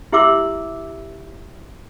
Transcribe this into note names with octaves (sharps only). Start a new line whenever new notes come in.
E4 G4 E5 C6 D6 E6